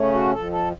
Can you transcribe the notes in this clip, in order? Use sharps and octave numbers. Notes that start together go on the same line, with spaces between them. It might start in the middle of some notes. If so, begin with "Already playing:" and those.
Already playing: C#3 A3 C#4
F#4
F2 A4
A4